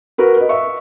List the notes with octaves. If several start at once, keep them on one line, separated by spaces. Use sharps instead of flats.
F#4 A#4 B4
B4 D#5
E5 C#6